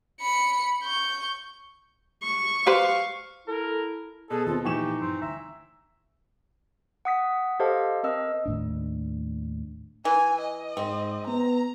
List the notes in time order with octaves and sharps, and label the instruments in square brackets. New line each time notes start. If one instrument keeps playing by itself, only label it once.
[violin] B5 C#7
C#6 G6
[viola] C#6
[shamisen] G4 B4 C5 [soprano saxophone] F5
[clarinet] E4 [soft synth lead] A4 [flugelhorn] A#4
[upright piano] B2 [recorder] G#4 [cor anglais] A4
[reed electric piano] D#2 C4 [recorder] F4
[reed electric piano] A#2 F3 [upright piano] E3 C#6 E7 [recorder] D#4 [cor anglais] G4
[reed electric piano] G2 [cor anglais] C4
[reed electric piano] D2 A#5 [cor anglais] E5
[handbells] F#5 D#6 B6
G4 A4 C5 D#5 F5 A5
C4 A#4 D#5 E6
[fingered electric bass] D#2 A2 D4
[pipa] E3 [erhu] G#5
[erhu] D#5
[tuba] G#2 [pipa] C4
[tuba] B3 [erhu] A#5